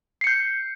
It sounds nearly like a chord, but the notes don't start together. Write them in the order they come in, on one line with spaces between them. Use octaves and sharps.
C7 C#7 G6